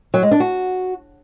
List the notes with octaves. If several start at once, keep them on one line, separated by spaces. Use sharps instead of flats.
F#3
G#3
D4
F#4